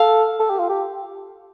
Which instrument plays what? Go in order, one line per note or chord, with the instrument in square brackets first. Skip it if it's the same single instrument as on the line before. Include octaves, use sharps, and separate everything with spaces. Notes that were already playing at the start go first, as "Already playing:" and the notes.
Already playing: [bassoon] A4 [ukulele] F5
[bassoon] A4
G4
F4
G4